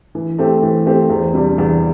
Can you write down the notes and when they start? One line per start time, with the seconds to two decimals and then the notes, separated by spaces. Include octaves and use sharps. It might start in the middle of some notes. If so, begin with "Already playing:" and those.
0.15 E3
0.38 A3 C4 G4
0.63 E3
0.86 A3 C4 G4
1.10 E2
1.34 C3 G3 D4
1.58 E2